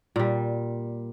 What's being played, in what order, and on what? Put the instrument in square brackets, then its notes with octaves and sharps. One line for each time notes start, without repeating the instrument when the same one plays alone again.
[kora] A#2 G3